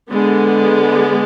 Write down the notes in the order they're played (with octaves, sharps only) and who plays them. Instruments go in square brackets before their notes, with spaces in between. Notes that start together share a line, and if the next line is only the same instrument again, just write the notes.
[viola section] D3 G#3 B3